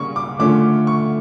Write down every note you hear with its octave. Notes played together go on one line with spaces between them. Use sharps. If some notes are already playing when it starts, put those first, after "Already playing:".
Already playing: C#3 G3 A#3 C#4 C#6
D6
D3 A3 C#4 F4 D6
C#6